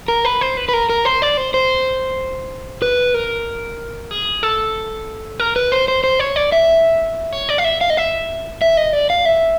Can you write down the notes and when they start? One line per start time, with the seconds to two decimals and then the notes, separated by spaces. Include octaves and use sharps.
0.08 A#4
0.25 B4
0.41 C5
0.57 B4
0.69 B4
0.73 A#4
0.89 A#4
1.05 C5
1.22 D5
1.37 C5
1.54 C5
2.82 B4
3.14 A#4
4.11 G#4
4.43 A4
5.40 A#4
5.56 B4
5.72 C5
5.88 C5
6.04 C5
6.20 C#5
6.36 D5
6.52 E5
7.33 C#5
7.49 D5
7.58 F5
7.64 E5
7.81 F5
7.90 D#5
7.97 E5
8.62 E5
8.77 D#5
8.93 D5
9.10 F5
9.25 E5